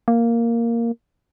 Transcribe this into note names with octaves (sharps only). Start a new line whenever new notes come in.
A#3